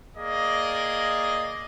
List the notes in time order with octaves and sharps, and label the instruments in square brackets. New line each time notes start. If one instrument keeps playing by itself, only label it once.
[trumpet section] A#3 G#4 D5 D#5